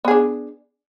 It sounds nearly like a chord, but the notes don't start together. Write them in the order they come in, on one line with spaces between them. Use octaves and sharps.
B3 G#4 D4